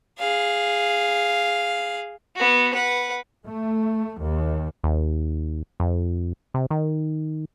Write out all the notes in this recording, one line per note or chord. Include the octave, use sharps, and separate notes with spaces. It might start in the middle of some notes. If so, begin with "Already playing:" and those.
G#4 F5
B3 F#4
B4 F#5
A3
D#2
D#2
F2
C3
D#3